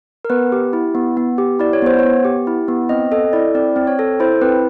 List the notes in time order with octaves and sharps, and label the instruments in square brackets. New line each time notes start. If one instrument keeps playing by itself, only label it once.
[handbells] A#4
B3 B4
G4
E4
B3
B3
G4
E4 D5
C#5
B3 C5
C#5
B3
G4
E4
B3
C4 D#5
A4 D#5
E4 D5
C4 D5
C4
C#5
A4
E4 C5
C4 B4